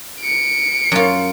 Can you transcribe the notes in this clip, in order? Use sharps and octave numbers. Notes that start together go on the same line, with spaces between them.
C#7 D7
F#2 F4